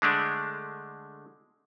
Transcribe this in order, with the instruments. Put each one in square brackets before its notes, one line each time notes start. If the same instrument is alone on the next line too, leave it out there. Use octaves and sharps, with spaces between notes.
[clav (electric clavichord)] D3 G#3 A3 D4